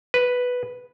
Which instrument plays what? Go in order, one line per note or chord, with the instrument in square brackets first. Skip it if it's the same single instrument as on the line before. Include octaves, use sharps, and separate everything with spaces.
[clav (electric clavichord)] B4